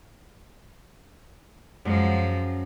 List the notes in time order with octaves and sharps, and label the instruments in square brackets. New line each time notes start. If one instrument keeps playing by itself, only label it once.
[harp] F#2 [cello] F3 G#3